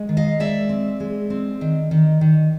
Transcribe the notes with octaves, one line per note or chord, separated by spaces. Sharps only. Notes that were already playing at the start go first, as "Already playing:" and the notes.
Already playing: G#3
D#3
D#5 F5
G#3 D5 E5
C4
G#3
C4
D#3
D#3
D#3